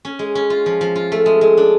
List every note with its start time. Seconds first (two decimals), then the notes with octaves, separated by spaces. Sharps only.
0.05 C#4
0.19 G#3
0.35 C#4
0.50 F4
0.66 F3
0.81 F3
0.96 F4
1.12 A3
1.26 G#3
1.41 G#3
1.57 D4